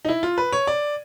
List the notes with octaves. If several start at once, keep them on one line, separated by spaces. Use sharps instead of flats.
D#4
E4
F4
B4
C#5
D5